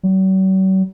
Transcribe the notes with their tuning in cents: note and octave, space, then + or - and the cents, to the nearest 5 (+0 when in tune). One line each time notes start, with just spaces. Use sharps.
F#3 +45